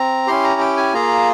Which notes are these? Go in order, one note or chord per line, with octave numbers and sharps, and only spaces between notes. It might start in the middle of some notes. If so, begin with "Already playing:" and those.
Already playing: C4 A#5
C#4 E4 G4 C6
A#5
G5
G#5
A#3 F4 G#4 A#5